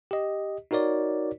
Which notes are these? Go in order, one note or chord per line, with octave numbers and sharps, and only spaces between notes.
G4 D#5
D#4 F#4 A#4 C#5 D5